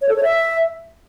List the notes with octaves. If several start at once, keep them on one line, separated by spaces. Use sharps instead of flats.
C#5
A4
C#5
E5